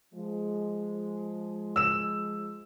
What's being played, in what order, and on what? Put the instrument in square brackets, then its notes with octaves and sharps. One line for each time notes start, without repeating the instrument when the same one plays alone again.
[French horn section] F3 G#3
[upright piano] E6 E7